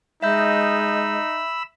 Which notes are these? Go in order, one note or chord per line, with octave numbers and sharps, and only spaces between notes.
G#3 D#4 E5 B5 E6 G6